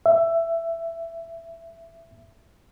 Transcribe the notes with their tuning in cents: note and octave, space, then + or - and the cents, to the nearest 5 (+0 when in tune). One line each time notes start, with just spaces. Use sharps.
E5 +15